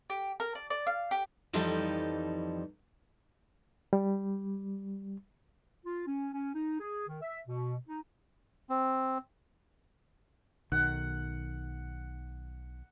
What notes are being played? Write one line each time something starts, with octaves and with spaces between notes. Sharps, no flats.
G4
A#4
D5
D5
F5
G4
F2 E3 F3 G3 D#4 A4
G3
F4
C#4
C#4
D#4
G#4
D#3
E5
B2
D#4
C4
B1 D#3 F#5